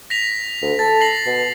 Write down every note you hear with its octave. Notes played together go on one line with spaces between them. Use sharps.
A#6 B6 F7
D2
A4 A6
A#6 C7 F#7
B2